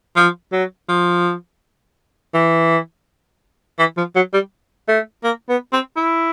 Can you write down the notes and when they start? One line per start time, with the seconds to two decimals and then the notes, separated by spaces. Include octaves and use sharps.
0.16 F3
0.52 F#3
0.89 F3
2.34 E3
3.79 E3
3.98 F3
4.16 F#3
4.33 G3
4.88 A3
5.24 A#3
5.49 B3
5.73 C4
5.97 E4